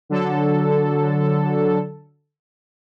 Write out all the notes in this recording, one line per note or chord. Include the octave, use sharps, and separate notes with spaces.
D3 F#3 A4